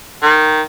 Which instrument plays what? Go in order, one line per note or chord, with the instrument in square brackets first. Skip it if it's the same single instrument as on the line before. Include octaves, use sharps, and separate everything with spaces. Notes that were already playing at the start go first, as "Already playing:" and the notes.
[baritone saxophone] D#3